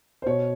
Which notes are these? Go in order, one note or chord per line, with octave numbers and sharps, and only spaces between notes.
C5
B2 C#5